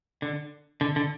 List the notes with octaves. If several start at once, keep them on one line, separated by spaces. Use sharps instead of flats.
D3
D3
D3